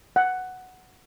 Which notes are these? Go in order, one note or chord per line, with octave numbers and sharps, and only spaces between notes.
F#5